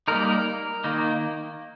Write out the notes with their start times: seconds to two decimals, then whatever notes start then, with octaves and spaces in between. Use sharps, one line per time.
0.08 G3 A#3 D#4 A#4
0.84 D#3 A#3 D#4